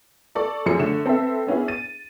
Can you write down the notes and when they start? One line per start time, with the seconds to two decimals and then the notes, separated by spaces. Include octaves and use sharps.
0.35 A4 D5 C#6
0.66 F#2 F3 G#4 C#7
0.79 D3 A3 E7
1.06 C4 A4 B4 E5
1.47 B3 C#4 D4 E4 G#4
1.68 A6 D#7